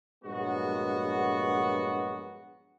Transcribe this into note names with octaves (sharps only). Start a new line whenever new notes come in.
A#1 G2 F#3 G#3 B3 F#4